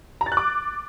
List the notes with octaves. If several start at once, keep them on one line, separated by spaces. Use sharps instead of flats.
A#5
A6
F#6
D6